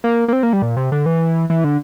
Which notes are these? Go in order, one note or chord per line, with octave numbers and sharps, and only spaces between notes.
A#3
A#3
C4
A#3
G3
A#2
C3
D3
E3
E3
D3